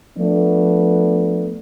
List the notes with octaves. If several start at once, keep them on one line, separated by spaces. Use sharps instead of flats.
F3 A3 B3 D4